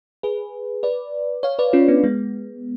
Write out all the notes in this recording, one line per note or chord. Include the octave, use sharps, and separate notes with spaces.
G#4 B4
B4 D5
C#5 F5
B4 D5
C#4 F4
B3 D4
G#3 B3